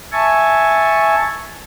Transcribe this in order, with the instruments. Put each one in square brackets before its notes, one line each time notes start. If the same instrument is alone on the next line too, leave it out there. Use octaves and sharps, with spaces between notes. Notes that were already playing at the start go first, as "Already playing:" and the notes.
[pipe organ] E5 G#5 A5 C#6